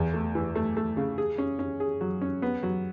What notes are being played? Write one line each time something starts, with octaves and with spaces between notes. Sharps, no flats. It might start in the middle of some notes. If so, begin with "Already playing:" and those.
Already playing: E2
A3
E3
A3
A3
C#3
G#4
C#4
C#4
G#4
F#3
C#4
B3
F#3